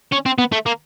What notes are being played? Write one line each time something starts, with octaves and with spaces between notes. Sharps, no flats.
C#4
C4
B3
A3
A#3